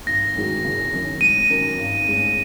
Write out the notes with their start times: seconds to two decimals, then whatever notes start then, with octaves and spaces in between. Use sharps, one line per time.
0.06 G#1 A#6
0.35 F#2 D#3 G#3 F#4
0.64 F#1
0.92 F#2 D#3 F#3
1.21 G#2 D#7
1.50 D#3 F#3 C#4 A#4
1.78 G#1
2.08 G#2 G#3 C#4